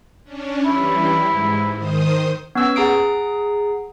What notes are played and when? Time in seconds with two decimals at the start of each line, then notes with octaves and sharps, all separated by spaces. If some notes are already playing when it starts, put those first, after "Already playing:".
0.24 C#4 D4
0.65 E3 G3 E4
1.24 G#2
1.75 D#3 C5 D#6
2.55 B3 C#4 C#6 E6
2.76 G#4 F#5 A#5 D#6 C7 D7